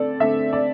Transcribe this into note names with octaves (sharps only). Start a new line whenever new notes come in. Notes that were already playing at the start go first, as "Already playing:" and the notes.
Already playing: D3 A3 C4 A4 D5
D3 A3 C4 E5
D5